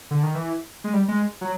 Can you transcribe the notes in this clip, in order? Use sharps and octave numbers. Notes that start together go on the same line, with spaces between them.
D3
D#3
E3
G#3
G3
G#3
F#3